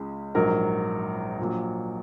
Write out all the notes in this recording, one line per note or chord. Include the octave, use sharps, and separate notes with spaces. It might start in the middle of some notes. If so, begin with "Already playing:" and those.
Already playing: C#2 C#3 G#3
A#1 G#2 F#3 A#4
A#1 A#2 F#3